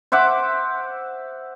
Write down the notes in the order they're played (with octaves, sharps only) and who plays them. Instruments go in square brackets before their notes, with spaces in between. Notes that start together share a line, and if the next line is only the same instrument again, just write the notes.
[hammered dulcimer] C5 E5 F#5 D6